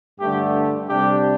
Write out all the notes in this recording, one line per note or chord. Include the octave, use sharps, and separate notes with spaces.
G2 D3 A3 D4 G4
C3 G3 D4 G4